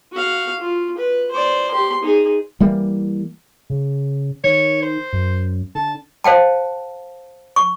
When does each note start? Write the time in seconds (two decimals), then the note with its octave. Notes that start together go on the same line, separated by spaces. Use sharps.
0.12 F#4 F5
0.60 F4
0.98 B4
1.31 C5 D5
1.71 G4 C6
2.03 D#4 G#4
2.60 E3 G3 A#3
3.70 C#3
4.44 D#3 C#5
4.82 C5
5.13 F#2
5.75 D3 A5
6.24 C5 F5 G5 A5
7.56 C#6